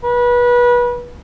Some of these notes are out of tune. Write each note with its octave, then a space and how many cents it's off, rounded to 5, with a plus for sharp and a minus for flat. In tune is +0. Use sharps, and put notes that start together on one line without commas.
B4 -25